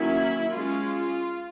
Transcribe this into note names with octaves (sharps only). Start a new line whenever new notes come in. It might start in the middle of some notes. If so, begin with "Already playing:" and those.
Already playing: D#3 F#3 A#3 C#4 E4
G#3 C#4 F4